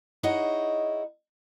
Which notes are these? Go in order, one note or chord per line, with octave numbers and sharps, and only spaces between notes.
D#4 E4 G#4 C#5 D#5 F#5